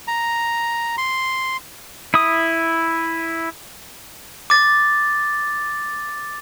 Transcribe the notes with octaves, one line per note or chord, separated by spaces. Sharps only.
A#5
C6
E4 D#6
D6 A6